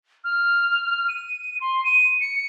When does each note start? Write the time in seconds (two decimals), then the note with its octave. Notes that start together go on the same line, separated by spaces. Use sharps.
0.24 F6
1.08 D#7
1.60 C6
1.84 D#7
2.20 C#7